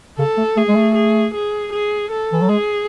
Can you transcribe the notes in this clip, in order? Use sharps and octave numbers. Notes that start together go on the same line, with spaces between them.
C#3 A4
A3
A3 G#4
G#3
A3
G#4
G#4
G#4
A4
E3
F#3
G#3 G#4